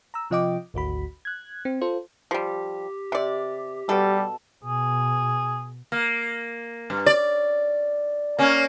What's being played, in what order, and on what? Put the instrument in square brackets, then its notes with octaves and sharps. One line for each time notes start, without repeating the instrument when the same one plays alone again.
[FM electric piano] A#5 E6
C3 F3 F4 D#5 G5 D6
G#1 D2 F#4 B5
F#6 G#6
C4
F4 A4 C5
[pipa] F3 G3 [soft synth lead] G4
[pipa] C3 D5
[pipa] B2 A4 [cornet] G3
[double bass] B2 [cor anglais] G#4
[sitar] A#3
G2
D5
A#3 C#4